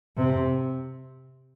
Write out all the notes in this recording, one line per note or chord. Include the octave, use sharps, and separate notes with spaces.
C3